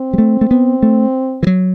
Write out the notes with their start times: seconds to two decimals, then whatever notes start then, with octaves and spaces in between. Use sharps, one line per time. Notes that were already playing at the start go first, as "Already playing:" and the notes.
Already playing: C4
0.13 G3
0.18 A3
0.41 A3
0.51 B3
0.83 A3
1.43 E3
1.47 F#3